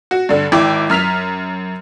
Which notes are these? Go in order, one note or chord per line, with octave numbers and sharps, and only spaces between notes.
F#4
G2 D3
G#1 E4 G5 D6
F#2 F6 B6 F7